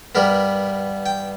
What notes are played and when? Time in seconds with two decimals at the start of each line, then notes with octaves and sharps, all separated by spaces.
0.15 G2 G3 B3 A#4
1.06 G5